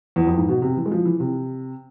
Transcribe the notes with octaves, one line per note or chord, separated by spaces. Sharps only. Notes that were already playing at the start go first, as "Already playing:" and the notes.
E2
F2
G#2
B2
C3
E3
G#3
F3
E3
C3